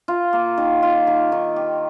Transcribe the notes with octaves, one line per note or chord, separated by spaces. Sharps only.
F4
A#3
D#3
F4
D#3
D#3
G4